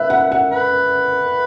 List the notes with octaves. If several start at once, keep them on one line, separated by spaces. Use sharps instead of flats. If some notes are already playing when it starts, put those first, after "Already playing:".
Already playing: B4 E5
F#5
F#5
B4